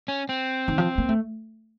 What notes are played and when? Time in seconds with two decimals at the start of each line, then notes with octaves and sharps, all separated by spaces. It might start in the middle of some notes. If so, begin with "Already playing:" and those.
0.08 C#4
0.29 C4
0.68 D#3
0.78 F3
0.98 A#3
1.09 A3